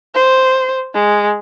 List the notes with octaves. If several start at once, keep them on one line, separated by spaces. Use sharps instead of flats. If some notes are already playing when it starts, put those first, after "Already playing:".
C5
G#3